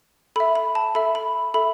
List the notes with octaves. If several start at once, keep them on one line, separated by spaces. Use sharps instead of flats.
A4 E5 B5
B5
A5
A4 E5 B5
B5
A4 E5 B5